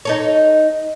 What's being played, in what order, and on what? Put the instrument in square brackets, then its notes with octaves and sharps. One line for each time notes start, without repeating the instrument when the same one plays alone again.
[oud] D#4 A4 C#5